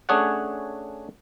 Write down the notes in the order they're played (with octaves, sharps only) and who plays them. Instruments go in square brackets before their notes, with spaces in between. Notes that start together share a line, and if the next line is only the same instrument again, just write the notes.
[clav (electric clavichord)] A3 C#4 D4 G#4 C#5 F#5